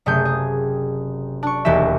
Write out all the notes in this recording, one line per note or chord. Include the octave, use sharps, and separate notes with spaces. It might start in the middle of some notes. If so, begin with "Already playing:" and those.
F#1 C3 A3 G#4 G6
G#4
D4 C#6
E1 D#2 E3 G4 E5